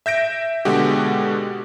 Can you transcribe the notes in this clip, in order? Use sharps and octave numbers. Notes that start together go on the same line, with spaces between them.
E5 G6 A#6 D7
B2 D3 G#3 F#4 G4